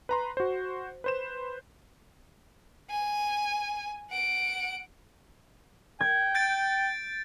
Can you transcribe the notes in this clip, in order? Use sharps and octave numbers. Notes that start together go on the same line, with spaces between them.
B4 A#5 C6
F#4 C5
B4 C5 E7
G#5
F#5 D7
G5 G#6
G6 A6 D7